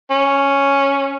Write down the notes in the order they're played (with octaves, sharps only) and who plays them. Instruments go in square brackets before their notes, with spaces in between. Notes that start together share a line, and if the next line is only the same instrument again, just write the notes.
[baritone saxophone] C#4